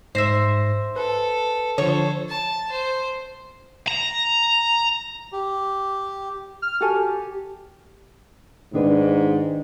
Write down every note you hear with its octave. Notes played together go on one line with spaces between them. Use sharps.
G#2 C5 E5 A#6
A4 B4
D3 F3 A4 C5 C#5
A5
C5
A#5
G4
F6
F#4 G4 A4 G#5
G#2 D#3 D4 B4